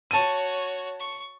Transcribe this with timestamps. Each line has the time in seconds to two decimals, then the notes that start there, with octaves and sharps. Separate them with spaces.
0.11 F#4 C#5 A5 D#7
1.00 C#6